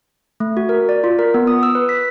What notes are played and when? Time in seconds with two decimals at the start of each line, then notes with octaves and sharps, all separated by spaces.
0.40 A3
0.57 F#4
0.69 A#4
0.89 D5
1.04 F4
1.19 A#4
1.34 B3
1.47 D#6
1.63 E6
1.75 B4
1.89 B6